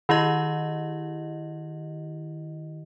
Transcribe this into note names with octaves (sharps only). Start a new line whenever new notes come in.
D#3 E4 G4 D#5